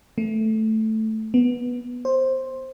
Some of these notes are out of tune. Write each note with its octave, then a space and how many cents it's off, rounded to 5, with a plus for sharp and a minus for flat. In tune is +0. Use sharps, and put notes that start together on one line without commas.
A3 +0
B3 -10
C5 +10